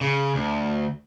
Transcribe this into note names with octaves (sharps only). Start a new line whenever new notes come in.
C#3
D2